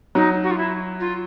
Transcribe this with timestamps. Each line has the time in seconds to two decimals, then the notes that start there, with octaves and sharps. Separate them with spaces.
0.15 F#3 D#4
0.43 F#4
0.51 F4
0.57 E4
1.00 F4